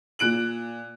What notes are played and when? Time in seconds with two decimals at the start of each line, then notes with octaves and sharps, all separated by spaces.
0.19 A#2 F#6 D7 F#7